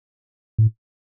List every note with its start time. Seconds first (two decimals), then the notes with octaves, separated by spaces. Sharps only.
0.59 A2